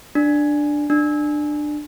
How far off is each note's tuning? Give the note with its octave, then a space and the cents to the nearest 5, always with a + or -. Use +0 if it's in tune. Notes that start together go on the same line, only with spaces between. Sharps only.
D4 +5
D4 +20